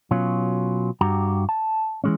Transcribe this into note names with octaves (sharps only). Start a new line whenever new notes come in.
B2 F#3 C#4 F4
G2 F#4 G4 A#5
A5
E3 G#3 C#4